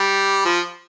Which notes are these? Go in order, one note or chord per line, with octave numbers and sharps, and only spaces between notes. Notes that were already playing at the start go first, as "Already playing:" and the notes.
Already playing: G3
F3